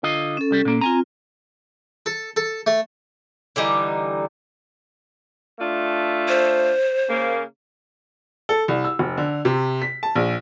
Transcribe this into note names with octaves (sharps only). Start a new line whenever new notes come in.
D3 F4 D#5
C#4 A4
C2 G3
A#2 A#3
C4 F4 G#5 A#5
A4
A4
A3
D3 E3 G3 D#4
A3 D4 F4
C5
C#3 A#3
A4
C2
E6
F1
D3
C3
B6
A5
A#1